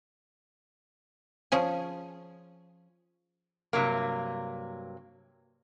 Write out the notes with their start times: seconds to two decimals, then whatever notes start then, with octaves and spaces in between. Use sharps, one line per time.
1.52 F3 C#4 G#4
3.73 G2 C3 F#3 A#3